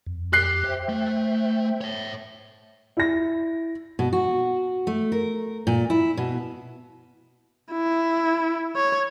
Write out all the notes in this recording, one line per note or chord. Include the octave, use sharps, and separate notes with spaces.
F2
G4 F#6 C7
C5 E5 G5
A3
C#5 E5
E4 A#6
B2
F#4
A3
A#4
A#2
E4
B2
E4
C#5